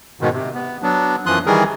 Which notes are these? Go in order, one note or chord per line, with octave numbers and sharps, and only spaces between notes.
G#2 B2 D#3
C3
B3
F#3 B3 D4
F#2 E3 F3 C6 D#6 F#6
D#3 E3 G3 G#4 A#4